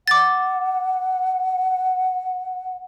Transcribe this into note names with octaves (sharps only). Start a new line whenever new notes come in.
F#5 D6 A6